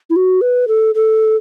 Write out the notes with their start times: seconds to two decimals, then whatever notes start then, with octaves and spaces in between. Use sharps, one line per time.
0.10 E4
0.16 F#4
0.41 B4
0.68 A4
0.95 A4